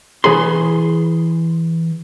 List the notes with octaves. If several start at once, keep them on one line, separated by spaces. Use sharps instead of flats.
E3 G#4 B5 C6